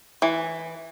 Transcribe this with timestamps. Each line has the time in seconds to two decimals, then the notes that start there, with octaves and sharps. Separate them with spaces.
0.22 E3